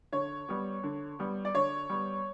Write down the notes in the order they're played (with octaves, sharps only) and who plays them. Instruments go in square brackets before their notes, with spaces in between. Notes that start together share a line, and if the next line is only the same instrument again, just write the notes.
[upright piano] D3 C#5
G3 B3
D3
G3 B3
D5
D3 C#5
G3 B3